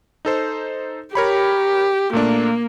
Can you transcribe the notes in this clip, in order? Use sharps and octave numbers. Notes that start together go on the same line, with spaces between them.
D#4 A4 C5
G4 A#4 C#5 B5
A#2 A3 A#3 D4